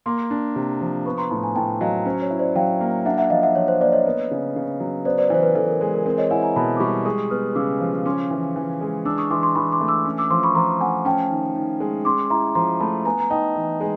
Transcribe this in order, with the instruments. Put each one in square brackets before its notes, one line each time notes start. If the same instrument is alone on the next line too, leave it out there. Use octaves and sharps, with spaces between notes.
[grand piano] A#3 [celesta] C6 D6
[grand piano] D4
C3
F3
[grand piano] B3 [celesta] B5 C#6
[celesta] A#5 C6
[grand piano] A2 [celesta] A5 B5
[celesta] G#5 A#5
[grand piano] A2 [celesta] G5 A5
[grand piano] F#3 [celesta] D#5 F5
[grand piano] C#4 [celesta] C5
[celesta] C#5
[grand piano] E4
[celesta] C5 D5
[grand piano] F#3 [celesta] F5 G5
[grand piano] A#3
[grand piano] D4 [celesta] E5 F#5
[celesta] E5 F#5
[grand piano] F3 [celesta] D#5 F5
[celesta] E5 F#5
[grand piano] F3 [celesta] C#5
[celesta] C5
[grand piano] A#3 [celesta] C5 D5
[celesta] C#5 D#5
[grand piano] B3
C#3
C#3
F#3
[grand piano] B3 [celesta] C5 D5
[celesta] C5 D5
[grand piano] E3 [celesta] C5
[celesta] B4
[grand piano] E3 [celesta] A4
[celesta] A#4
[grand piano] G#3 [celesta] A4
[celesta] A#4
[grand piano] C4 [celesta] A#4
[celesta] C#5 D#5
[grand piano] E4 [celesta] F#5 G#5
[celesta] G#5 A#5
[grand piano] B2 [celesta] A5 B5
[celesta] D6
[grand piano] G3 [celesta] B5 C#6
[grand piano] G#3 [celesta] C#6 D#6
[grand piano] B3 [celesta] D#6 F6
[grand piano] C#3 [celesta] D6 E6
[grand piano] F3
[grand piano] C#4 [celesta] C6 D6
[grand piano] E3
E3
G#3
[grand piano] D4 [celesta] D6 E6
[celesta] C#6 D#6
[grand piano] E3 [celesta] C6 D6
[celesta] C6 D6
[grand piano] E3 [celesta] B5 C#6
[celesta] C6 D6
[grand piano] A3
[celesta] D6 E6
[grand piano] C#4
[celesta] D6 E6
[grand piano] F3 [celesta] C6 D6
[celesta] B5 C#6
[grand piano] F3 [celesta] A#5 C6
[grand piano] A3 [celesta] F#5 G#5
[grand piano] C#4 [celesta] G5 A5
[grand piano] D#3
D#3
G#3
[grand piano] C#4 [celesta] C6 D6
[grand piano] E4 [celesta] A#5 C6
[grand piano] F3 [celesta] A#5 C6
[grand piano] A3 [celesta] A5 B5
[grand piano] B3 [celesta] G#5 A#5
[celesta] A#5
[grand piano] D#4 [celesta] G5 A5
[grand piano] E3
G#3